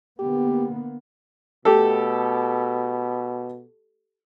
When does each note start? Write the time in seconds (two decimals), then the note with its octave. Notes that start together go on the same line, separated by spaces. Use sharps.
0.19 D3 A#3 B3 G4
1.65 B2 A3 G4 A4